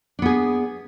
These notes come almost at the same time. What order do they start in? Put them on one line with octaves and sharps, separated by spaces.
D4 B3 G#4